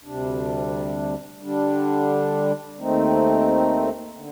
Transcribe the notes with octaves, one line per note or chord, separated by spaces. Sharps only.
D2 C3 G3 D4
D3 G3 D4
D#2 D#3 A3 C4 D#4
D3